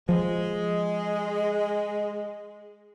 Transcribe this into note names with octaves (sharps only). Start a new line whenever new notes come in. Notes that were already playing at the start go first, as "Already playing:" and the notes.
F3 G#3